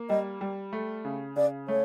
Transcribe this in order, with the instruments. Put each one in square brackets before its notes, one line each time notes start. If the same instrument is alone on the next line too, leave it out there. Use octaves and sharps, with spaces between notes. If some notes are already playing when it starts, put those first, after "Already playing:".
Already playing: [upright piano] A#3
[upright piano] G3 [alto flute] D#5
[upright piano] G3
A3
C#3
[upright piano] C#3 [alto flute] D5
[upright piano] A3 [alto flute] C#5